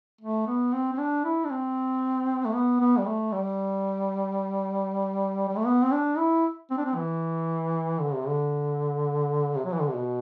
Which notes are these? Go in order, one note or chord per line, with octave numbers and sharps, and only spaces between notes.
A3
B3
C4
C4
D4
E4
D4
C4
A3
B3
B3
G3
A3
G3
G3
A3
B3
C4
D4
E4
C4
D4
C4
E3
D3
C3
D3
C3
F#3
E3
D3
C3
B2